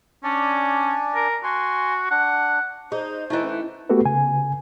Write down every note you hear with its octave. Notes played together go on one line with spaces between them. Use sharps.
C#4 D4 D5 G#5
A#4
F#4 G#5 C6
D4 F#5
D#4 G#4 C5
E3 A3 D#4 E4 D#5
C#4
A3 B3 F#4 G4 A4 B4
C#3 G#5